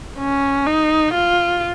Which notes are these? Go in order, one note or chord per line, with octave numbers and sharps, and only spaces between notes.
C#4
D#4
F4